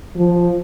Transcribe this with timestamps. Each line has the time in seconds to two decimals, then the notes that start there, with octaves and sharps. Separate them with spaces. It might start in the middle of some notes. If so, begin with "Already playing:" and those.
0.16 F3